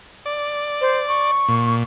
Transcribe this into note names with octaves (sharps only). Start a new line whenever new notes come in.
D5
C5
C#6
A#2